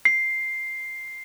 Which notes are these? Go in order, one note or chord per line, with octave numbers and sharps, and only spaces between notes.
C7